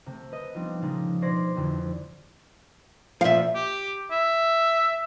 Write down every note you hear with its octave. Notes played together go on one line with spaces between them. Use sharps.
C3 A3
B4 D#5
F3 G3 B3 C4 D4 D#4
A#2 C#3 F3 G#3 D4 D#4
B2 C5 D5 C6 G#6 A#6
F1 F2 D3 E3
A#2 F3 E5 F5
G4
E5